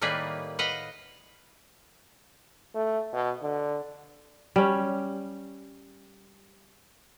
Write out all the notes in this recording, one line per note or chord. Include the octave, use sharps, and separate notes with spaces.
A2 D#3 G3 A#3 G#4 B4
B4 D#5 F5 F#5
A3
B2
D3
G3 C#4